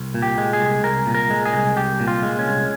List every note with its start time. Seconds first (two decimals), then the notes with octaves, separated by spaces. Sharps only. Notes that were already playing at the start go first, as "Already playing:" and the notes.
Already playing: C2
0.14 A#2
0.22 G4
0.38 G#3
0.53 G#4
0.61 C2
0.84 C2 A#4
1.07 A#2
1.14 A#4
1.30 G#3
1.45 G#4
1.53 C2
1.76 C2 G4
2.00 A#2
2.08 F4
2.23 G#3
2.39 C#4
2.46 C2